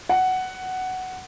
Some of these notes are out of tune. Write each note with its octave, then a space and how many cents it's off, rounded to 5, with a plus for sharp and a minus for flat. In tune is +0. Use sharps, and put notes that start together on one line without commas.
F#5 +10